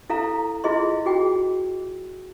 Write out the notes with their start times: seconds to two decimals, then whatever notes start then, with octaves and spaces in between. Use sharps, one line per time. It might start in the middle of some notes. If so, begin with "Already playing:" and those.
0.10 E4 A4 F5 A#5
0.64 E4 F4 G#4 D#5 C6
1.05 F#4 G#4 G5